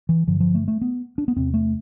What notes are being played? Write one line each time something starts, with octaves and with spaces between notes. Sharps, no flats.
E3
G2 D3 F3
F3
A3
A3
B3
D4
B3
E2 C3 C4
A3